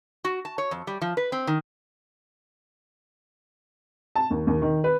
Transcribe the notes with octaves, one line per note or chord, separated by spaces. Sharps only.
F#4
A5
C#5
F2
G3
F3
B4
C4
D#3
A5
D#2
D#2
D#3
B4